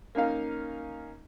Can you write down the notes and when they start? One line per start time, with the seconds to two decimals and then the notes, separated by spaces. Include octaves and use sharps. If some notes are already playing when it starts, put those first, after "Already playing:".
0.15 A#3 C#4 D#4 F5